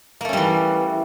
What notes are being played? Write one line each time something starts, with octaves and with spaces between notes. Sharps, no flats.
E3 G3 A3 A#3 C#4